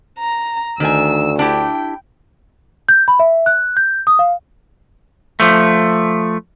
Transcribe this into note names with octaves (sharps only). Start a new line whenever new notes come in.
A#5
D2 D#3 G#5 E6
D4 E4 G4 G5
G6
B5
E5
F#6
G6
D#6
F5
F3 A3